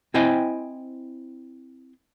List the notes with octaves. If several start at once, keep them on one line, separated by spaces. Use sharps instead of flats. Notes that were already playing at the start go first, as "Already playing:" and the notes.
C4 E4 C5 D#5 G5 G#5